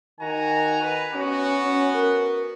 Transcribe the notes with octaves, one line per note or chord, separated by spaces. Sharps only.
D#3 F#4 G#5 A#5
B4
B3 C#4 F#4
C#4
A#4